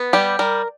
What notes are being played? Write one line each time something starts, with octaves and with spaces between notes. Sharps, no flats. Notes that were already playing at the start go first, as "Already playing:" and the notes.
Already playing: B3
G3 G4
G3 A#4